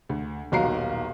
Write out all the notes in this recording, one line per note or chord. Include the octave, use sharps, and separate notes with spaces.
D2
D#1 B1 F#4 F5 A#5 C7